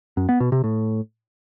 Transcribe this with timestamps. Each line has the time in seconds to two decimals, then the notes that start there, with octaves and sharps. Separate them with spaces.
0.17 F#2
0.29 B3
0.40 B2
0.52 C3
0.64 A2